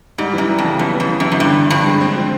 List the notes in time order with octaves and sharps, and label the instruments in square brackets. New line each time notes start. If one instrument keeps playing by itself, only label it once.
[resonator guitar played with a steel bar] G#2 [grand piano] G3
[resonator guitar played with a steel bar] F#2 [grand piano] E3
[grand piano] G3
[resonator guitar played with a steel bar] F2
[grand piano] C#3
[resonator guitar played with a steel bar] F#2 [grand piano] B3
[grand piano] E3
[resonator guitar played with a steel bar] F2
[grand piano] B3
[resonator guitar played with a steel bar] F#2
[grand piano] E3
[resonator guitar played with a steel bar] F#2
[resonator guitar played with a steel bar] G2 [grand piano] D3
[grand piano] D3
[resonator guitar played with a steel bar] G2 [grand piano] F3
[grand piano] G#3
C4
F3